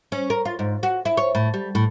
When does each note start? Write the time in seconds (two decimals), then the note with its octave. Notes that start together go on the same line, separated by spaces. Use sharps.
0.12 C#4
0.30 A#4
0.45 F4
0.59 G#2
0.83 F#4
1.05 E4
1.17 C#5
1.35 A2
1.54 G3
1.75 A2